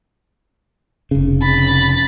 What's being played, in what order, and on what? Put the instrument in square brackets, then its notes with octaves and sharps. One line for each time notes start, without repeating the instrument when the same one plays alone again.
[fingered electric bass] F1 C#3
[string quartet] B5 A6